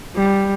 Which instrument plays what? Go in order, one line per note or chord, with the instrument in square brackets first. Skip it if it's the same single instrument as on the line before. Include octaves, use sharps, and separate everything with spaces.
[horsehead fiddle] G3